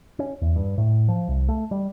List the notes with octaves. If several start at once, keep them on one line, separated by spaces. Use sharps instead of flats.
C#4
E2
G2
A2
F3
C2
A3
G3